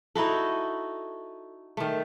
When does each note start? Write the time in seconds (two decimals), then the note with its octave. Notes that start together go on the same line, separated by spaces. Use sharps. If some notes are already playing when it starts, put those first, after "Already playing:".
0.15 D#4 E4 F#4 A4
1.77 D#3 A3